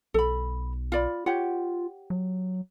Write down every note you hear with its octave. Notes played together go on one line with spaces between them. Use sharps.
B1 A4 B5
F4 D5 B5
F4 G4 C#5 F#5
F#3